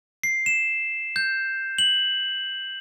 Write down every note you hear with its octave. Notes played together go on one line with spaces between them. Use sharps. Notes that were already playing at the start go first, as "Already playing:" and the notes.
C7
E7
G6
F#7